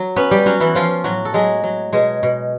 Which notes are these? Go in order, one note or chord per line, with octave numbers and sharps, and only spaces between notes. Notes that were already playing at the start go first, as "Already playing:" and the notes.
Already playing: F#3
B3 C#4 B4
G3 G4
F#3 C#4 F#4
E3 E4
F3 C#4 F4
A2 F#3 F#4
A4
F#3 G#3 G#4
F#3
B2 G#3 G#4
B2